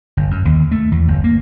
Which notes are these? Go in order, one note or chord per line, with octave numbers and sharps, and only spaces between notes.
G1
F#2
D#2
A3
E2
G1
A#3